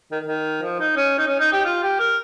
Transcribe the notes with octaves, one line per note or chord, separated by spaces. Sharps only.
D#3
D#3
F3
D#4
C#4
D#4
C#4
D#4
G4
F4
G4
A#4